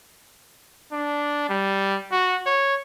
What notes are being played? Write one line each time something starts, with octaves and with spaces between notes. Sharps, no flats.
D4
G3
F#4
C#5